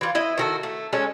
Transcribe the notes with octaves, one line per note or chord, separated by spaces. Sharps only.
E3 F4
E4 D#5
D#3 F#4 A4
A3
G#3 C#4 A4